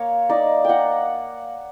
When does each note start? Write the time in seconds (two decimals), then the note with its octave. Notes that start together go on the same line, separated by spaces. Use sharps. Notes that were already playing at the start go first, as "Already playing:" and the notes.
Already playing: A#3 C#5
0.29 D#4 D5
0.65 A#3 F#5 G5